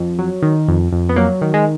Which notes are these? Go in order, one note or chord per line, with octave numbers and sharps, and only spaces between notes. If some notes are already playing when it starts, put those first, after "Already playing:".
Already playing: F2
F#3
D#3
F2
F2
B3
F#3 A#3
D#3
G#3